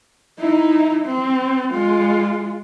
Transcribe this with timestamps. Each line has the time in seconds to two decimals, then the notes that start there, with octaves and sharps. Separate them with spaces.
0.40 D#4 E4
1.06 C4
1.72 G#3 F4